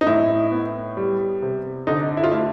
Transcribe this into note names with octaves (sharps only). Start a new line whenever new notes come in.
D#4
A2 E4
B3
G3
C3
D3 D#4
E4
F4
A3 E4